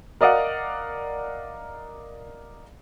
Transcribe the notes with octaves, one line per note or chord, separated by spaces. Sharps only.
A#4 D5 D#5 F5 F#5